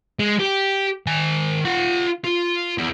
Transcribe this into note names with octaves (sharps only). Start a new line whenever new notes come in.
G#3
G4
D#3 G#5
F4 F#5
F4
E2